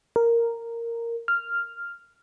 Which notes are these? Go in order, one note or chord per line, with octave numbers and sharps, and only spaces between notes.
A#4
F6